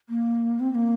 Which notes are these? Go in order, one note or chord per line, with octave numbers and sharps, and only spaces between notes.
A#3
C4
C4
A#3